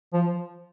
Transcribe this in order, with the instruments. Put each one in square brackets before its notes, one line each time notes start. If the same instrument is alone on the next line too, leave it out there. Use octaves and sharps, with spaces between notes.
[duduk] F3